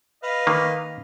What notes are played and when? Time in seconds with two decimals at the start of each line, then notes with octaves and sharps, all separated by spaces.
0.23 B4 D#5 F5
0.47 D#3 A#3